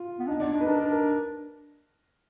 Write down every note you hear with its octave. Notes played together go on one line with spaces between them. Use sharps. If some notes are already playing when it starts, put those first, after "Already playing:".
Already playing: F4
B3
D4 D#4
B3 D4
D4 D#4
B4
D4 A#4
A#4
A#4